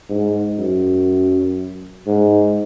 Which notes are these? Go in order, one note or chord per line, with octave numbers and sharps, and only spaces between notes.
G#2
F#2
G#2